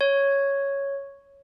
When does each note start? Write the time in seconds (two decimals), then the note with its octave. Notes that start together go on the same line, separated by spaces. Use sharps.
0.01 C#5